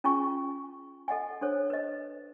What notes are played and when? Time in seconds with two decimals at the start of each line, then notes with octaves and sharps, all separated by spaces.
0.04 C#4 F4 G#4 G#5 C#6
1.08 A4 D#5 F#5 G#5
1.41 D4 A4 C5 C#5
1.70 B4 D#5